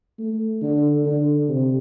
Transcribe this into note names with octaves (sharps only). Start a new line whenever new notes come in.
A3
D3
D3
C3